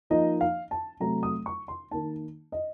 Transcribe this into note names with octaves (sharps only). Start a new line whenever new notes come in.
F3 A#3 D#4 D#5
F5
A5
C3 F#3 A3 A#5
D#6
C#6
C6
D#3 A#3 D#4 A5
D#5